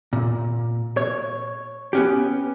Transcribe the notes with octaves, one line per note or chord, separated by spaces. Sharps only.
A#2
C#5
B3 C#4 G4